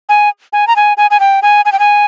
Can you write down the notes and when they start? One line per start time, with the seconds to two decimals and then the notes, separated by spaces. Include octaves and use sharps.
0.09 G#5
0.53 G#5
0.67 A#5
0.76 G#5
0.97 G#5
1.11 G#5
1.20 G5
1.42 G#5
1.65 G#5
1.72 G5
1.79 G#5